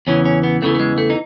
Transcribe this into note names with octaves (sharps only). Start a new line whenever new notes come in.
E2 C#3 E3 C#4
C#4
B3
E2 C#3 E3 A3
A3
G#3
A3
D#4